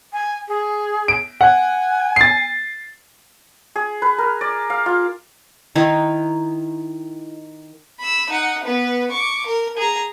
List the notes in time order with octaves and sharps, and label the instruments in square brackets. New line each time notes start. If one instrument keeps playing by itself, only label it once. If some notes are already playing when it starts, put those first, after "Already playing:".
[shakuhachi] G#5
G#4
[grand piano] D7
[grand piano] F#5 [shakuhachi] G#5
[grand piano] A6 C7
[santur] G#4
B4
A#4
D5
F5
F4
[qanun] D#3 D#4 E4
[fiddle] B5 E6
D#4 F#5
B3 B4
C#6 D6
A#4
G#4 A#5